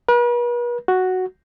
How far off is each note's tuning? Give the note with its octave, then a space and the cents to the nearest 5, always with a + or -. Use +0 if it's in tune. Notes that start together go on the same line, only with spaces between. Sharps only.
B4 -45
F#4 +0